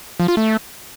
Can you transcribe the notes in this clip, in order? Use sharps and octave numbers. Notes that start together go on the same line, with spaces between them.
F3
F4
A3